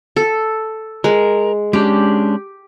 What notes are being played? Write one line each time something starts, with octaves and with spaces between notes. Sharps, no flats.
A4
G#3 A#4
G#3 C#4 D4 G4